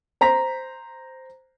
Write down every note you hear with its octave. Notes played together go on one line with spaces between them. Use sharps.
C5 A#5 B6